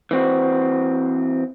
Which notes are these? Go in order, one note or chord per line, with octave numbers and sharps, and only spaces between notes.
E3 C4 F#4